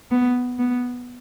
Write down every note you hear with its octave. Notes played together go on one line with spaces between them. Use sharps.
B3
B3